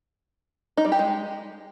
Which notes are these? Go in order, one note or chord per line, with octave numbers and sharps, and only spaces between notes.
D#4
G3
G4
G#3